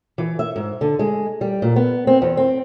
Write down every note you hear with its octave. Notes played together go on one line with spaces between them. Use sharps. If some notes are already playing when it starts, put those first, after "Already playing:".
E3
E5
G#2
D3
G#3
G3
A#2
B3
C4
E2
C4